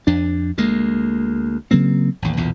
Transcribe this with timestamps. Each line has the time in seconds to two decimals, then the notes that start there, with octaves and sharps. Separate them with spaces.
0.07 F2 D4
0.58 D2 G#3 A#3
1.71 C#3 F#3 A#3 C4
2.22 A1 D#2
2.37 B1 E2 A#2